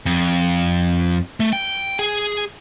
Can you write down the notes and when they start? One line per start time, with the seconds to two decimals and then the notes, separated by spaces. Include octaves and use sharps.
0.06 F2
1.40 A3
1.53 G5
1.99 G#4